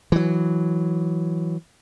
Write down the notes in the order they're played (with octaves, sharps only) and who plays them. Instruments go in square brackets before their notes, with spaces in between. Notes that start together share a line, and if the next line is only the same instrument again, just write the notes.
[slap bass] E3 F#3